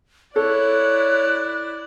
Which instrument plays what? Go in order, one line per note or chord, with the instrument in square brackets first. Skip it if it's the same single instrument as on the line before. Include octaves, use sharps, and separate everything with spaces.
[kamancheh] E4 D5 [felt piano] A4 [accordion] C#5 [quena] F#6